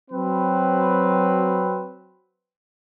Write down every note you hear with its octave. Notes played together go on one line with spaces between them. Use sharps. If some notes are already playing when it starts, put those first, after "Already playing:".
F#3 C4 B4